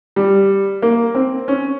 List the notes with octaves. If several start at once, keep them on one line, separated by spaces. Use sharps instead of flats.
G3
A#3
C4
C#4